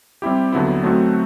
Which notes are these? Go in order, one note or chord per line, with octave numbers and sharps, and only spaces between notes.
G3 C4 E4 G4
D#2 D3 F#3 B3 E4
F#3 A3 C4 D#4 F#4